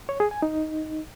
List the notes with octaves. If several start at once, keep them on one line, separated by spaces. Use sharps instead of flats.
C#5
G#4
G#5
D#4